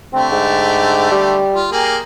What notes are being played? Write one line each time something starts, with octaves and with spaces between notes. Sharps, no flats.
D3 A3 C4 G4
G#2
G3
F4
A#3 G4 G#4